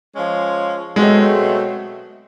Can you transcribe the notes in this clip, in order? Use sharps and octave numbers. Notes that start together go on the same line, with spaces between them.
F3 G#3 C#4
B2 F#3 G#3 A3 C4